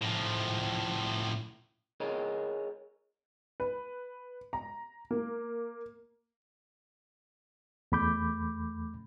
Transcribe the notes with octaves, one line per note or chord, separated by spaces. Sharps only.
A2 F3
G#4 A#4 C#5 D#5
B4
A#5
A#3
E2 A3 B5 D6 G6